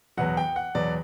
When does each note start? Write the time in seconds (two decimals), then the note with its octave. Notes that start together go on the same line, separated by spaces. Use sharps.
0.17 E2 B2 F#3 F#5
0.37 G5
0.56 F#5
0.75 E2 B2 F#3 D5